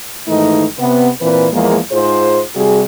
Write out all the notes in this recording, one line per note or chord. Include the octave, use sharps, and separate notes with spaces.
G#2 D#3 E3 A3 D#4
C3 B3
A#2 E3 C4 B4
E2 F3 G#3 A#3
G#2 F4 G#4 C5
C3 G3 F#4 G#4